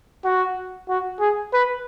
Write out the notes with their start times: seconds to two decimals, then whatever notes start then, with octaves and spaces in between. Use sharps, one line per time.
0.25 F#4
0.89 F#4
1.20 G#4
1.54 B4